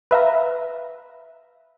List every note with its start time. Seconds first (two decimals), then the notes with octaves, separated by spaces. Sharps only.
0.11 B4 E5 F5 A#5